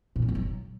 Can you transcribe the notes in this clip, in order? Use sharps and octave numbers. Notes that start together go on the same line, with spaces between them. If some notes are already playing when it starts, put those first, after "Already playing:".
A#2
F#3
A3
F#3